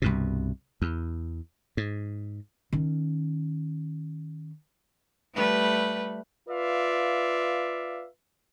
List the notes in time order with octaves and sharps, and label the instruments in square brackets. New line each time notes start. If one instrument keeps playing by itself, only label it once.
[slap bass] C2 G2 B2
E2
G#2
[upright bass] D#3 C#4
[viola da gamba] G3 A3 B4
[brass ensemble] F4 B4 D5 E5 F5